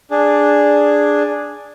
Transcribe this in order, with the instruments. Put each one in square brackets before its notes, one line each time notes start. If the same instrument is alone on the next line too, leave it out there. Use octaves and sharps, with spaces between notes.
[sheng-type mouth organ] D4 G#4